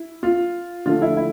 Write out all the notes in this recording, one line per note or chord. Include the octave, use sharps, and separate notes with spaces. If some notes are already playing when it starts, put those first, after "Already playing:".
Already playing: E4
F4
D3 F3 A3 F4
E4
E4